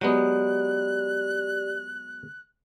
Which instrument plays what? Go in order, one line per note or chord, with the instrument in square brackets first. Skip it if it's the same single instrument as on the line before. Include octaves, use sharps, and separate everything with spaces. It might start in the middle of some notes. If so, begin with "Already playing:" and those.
[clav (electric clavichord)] F#3 G#3 B3 [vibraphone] G4 D5 [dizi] F#6